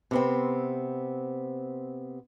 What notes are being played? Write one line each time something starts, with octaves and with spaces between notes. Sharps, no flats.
C3 B3 C4